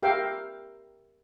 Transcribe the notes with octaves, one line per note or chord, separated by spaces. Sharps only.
G4 A#4 E5 F5 G5